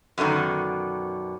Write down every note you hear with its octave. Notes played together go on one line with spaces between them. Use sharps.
F#2 B2 D3 D#3